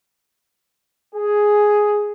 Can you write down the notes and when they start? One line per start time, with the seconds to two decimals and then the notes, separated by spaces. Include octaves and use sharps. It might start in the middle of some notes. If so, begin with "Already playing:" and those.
1.15 G#4